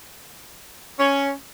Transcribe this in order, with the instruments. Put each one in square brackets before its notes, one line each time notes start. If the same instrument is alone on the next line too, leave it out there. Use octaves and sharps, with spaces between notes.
[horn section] C#4